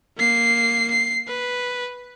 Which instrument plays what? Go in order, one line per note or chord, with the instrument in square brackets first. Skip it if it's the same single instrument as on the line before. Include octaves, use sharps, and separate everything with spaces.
[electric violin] A#3 C7
C7
B4